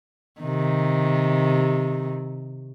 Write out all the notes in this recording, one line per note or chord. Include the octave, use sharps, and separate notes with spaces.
C3 D#3